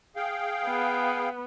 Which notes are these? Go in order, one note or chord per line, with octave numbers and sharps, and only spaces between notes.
G#4 F5 G5
B3